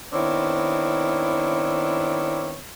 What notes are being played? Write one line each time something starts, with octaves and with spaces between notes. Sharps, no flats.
D#3 B3 C4 D4 E4 C#5